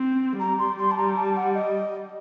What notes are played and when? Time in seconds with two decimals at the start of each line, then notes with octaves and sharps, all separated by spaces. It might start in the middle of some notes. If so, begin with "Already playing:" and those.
Already playing: C4
0.40 G3 A#5
0.59 C6
0.78 C6
0.91 A5
0.97 A#5
1.16 A5
1.36 F#5
1.54 D#5